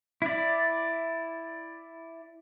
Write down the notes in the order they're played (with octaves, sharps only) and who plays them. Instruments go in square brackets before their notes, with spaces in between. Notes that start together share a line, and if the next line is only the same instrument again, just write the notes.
[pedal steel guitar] E4 D5